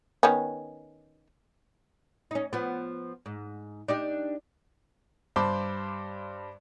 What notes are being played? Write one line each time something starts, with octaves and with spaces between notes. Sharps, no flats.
D#3 B3 C#4
C#4 D#4
F3 B3
G#2
D4 D#4 G4
G2 C5 A5 B5 C6 D6